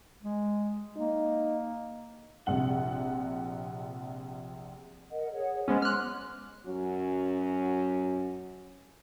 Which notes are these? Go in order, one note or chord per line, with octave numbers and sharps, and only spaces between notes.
G#3
A#3 D#4
A#1 C3 F#5 F#7
A#4 D#5 F#5
G#4 C#5 F#5
G#3 B3 C#4 C5
C6 D6 F6 F#6
F#2 F#3 C#4 F#4